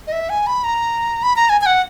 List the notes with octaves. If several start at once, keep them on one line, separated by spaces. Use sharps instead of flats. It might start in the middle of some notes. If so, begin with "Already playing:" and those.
D#5
E5
G#5
B5
A#5
B5
A#5
G#5
G#5
F#5